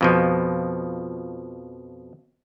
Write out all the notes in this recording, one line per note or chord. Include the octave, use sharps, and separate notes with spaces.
F2 B2 F3